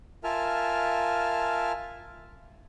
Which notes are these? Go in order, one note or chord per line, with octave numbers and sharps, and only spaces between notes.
F4 A#4 E5 G#5 A5 F6